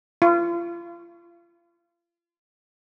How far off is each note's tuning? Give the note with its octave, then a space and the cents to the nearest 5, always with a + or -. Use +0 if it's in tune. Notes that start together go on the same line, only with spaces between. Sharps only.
F4 -35